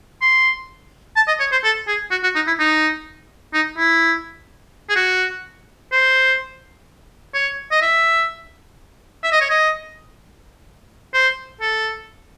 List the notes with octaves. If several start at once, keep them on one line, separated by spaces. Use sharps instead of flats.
C6
A5
D#5
C#5
C5
A4
G#4
F#4
F#4
D#4
E4
D#4
D#4
E4
G#4
F#4
C5
C#5
D#5
E5
E5
D#5
C#5
D#5
C5
A4